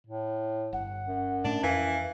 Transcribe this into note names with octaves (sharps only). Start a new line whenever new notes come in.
A2
G1 F#5
F#2
A2 A3 D4
F2 E3 F5